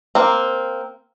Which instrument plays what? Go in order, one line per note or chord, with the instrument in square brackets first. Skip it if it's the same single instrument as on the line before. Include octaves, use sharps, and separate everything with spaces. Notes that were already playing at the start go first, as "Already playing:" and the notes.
[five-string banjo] A#3 C4